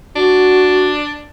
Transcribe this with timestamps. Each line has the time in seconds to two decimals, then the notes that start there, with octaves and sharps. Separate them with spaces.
0.16 D4 F#4